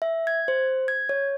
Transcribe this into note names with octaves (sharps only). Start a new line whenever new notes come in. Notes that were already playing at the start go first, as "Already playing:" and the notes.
E5
G#6
C5
G#6
C#5